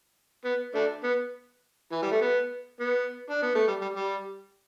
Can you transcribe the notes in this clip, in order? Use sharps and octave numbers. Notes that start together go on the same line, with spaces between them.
B3
A3 D4
B3
E3
G3
A3
B3
B3
D4
B3
A3
G3
G3
G3